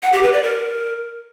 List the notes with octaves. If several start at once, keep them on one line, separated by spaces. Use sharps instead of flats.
F#5
G4
B4
D5
A#4